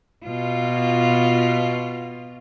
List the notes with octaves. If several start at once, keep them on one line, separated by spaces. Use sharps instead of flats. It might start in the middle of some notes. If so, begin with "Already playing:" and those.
B2 F4